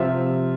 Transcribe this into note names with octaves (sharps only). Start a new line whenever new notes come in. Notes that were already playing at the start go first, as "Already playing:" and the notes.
Already playing: C3 F3 C4 F4 E5